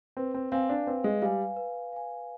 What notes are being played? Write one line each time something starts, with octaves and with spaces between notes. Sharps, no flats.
C4 B4
C4
C4 F5 G#5
D4
C4 B4
G#3
G3 F5 G#5
B4
F5 G#5